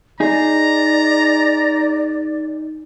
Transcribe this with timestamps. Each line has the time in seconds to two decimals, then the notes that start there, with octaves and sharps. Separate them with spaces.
0.20 D#4 G#4 D5 A#5